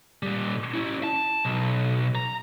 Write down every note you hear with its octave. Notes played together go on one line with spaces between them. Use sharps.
A#2 G3
C#4 E4
A5
B1
A#5